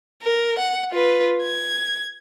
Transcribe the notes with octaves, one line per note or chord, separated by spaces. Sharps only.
A#4
F#5
F4 B4
G#6